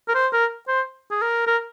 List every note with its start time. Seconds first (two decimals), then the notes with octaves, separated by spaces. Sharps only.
0.08 A#4
0.15 C5
0.33 A#4
0.68 C5
1.11 G#4
1.22 A#4
1.47 A#4